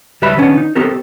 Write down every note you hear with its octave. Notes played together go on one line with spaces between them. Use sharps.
C#2 G3 B4 E5 A5 B5
D#3 B3 C#4 D4
D#4
B3 C4 G4 A4 A#4